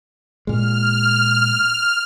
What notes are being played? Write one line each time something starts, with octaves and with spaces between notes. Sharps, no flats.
A#2 G#3 F6